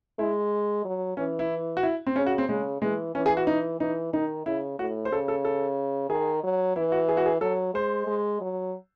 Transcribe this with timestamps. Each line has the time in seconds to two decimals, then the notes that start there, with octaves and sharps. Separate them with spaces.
0.19 G#3 E4
0.85 F#3
1.17 E3 C#4
1.39 E4
1.77 F#4
1.83 E4
2.06 C4
2.16 C#3 C#4
2.26 F#4
2.38 C4
2.48 C#3 G#3
2.82 E3 G#3
3.15 E3 C#4
3.26 G#4
3.37 F#4
3.47 D#4
3.80 E3 D#4
4.13 D#3 D#4
4.46 C#3 E4
4.79 A2 F#4
5.05 C5
5.11 C#3 A4
5.28 A4
5.45 A4
6.10 D#3 G#4
6.43 F#3
6.76 E3 E4
6.92 F#4
7.09 G#4
7.17 F#4
7.26 G#4
7.41 F#3 A4
7.74 G#3 C5
8.07 G#3
8.41 F#3